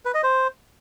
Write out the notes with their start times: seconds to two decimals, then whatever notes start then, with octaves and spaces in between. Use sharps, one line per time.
0.05 B4
0.14 D#5
0.23 C5